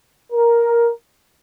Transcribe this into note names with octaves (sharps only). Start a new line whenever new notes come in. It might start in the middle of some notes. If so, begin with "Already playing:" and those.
A#4